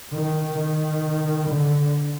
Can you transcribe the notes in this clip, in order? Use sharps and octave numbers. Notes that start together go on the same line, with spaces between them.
D#3
D#3
D3